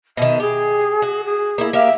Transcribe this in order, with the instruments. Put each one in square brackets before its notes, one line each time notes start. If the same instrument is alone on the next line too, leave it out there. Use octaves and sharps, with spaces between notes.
[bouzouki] B2 D#3 [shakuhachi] E5
[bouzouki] G4 [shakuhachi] G#4
[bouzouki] F#4
[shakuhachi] G#4
[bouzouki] A#3 E4
[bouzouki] A#3 G4 F5 [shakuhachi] E5